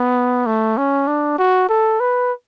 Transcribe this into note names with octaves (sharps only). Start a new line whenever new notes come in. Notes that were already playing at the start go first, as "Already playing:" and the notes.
Already playing: B3
A3
C#4
D4
F#4
A4
B4